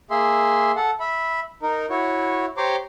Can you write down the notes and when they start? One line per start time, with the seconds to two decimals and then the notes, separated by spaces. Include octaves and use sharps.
0.11 A#3 G#4 E5 C6
0.76 A4 F#5
1.00 E5 B5
1.62 D#4 A#4
1.90 E4 F#4 C#5
2.57 G4 C5 C#5 A#5 C6 D6